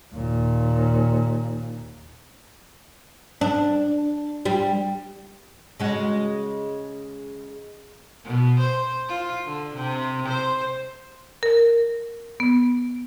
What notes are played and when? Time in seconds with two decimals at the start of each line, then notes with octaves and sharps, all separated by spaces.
0.14 D#2 A#2
3.41 D4
4.45 G3
5.79 C#3 G#3 F#4
8.25 B2
8.59 C5
9.08 F4
9.46 D3
9.75 C3
10.28 C5
11.43 A#4
12.40 B3